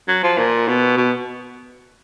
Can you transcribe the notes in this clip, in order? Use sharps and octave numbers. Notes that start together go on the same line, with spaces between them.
F#3
F3
A#2
B2
B2